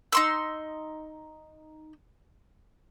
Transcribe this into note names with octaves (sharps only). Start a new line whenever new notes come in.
D#4 C6 E6